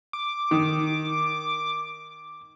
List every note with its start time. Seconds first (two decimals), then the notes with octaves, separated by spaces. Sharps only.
0.13 D6
0.51 D#3